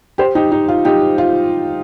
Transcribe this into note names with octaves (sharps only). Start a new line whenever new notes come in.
G4 C5
D#4 G4
D#4
F4
D#4 G4
F4